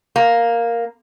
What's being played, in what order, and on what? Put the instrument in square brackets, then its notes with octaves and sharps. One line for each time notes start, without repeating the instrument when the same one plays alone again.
[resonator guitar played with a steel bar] A#3